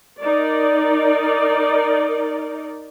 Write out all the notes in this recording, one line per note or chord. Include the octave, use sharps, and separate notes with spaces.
D#4 A#4 D5